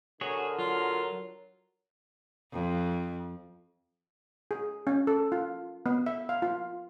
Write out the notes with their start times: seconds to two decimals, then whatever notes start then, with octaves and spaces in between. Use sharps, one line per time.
0.21 D3 F#4 G#4 A#4 C#5
0.59 F#3 F4
2.52 F2
4.51 G#4
4.87 C#4
5.07 A4
5.32 F4
5.86 B3
6.06 E5
6.29 F5
6.42 F4